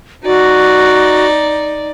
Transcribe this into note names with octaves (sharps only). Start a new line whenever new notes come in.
D#4 F#4 D5